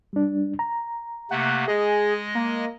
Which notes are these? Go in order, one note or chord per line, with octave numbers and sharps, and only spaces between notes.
G3 D4
A#5
C3 A3 A#3 F#5
G#3 G#4 D#5
A#3